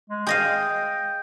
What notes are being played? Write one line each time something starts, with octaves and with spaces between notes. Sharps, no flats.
G#3
G#4 D#5 F5 G5